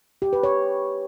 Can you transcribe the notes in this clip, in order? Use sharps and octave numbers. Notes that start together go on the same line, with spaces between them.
G4
B4
C#5